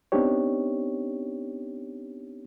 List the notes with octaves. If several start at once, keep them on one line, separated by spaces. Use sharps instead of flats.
B3 C4 D4 D#4 G4 C#5